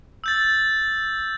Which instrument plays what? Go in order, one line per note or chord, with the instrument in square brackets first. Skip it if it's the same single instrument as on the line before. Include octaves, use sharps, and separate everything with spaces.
[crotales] E6 G6 A6